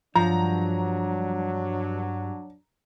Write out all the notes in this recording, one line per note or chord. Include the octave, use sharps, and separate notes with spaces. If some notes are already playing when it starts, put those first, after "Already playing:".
G2 F3 F#3 D4 A#5